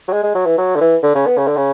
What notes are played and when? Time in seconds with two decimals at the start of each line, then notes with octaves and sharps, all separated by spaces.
0.08 F#3
0.13 G#3
0.23 G#3
0.35 F#3
0.46 E3
0.58 F#3
0.76 D3
0.80 E3
1.03 D3
1.15 C#3
1.26 B3
1.38 C#3
1.47 D3
1.57 C#3